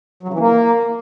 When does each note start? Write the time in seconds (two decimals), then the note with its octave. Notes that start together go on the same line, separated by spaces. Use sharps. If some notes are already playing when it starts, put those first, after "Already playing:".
0.23 F#3
0.28 C#3
0.33 E3
0.39 A#3